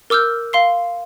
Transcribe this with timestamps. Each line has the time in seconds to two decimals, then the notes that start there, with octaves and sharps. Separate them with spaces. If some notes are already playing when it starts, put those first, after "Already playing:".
0.10 A#4 D6 E6 F6 G6
0.53 F5 C6 C7